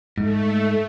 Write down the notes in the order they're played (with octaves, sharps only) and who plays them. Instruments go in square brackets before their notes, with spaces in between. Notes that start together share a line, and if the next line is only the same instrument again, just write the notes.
[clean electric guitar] G#2 [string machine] A3